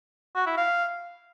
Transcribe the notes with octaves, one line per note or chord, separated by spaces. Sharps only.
F#4
E4
F5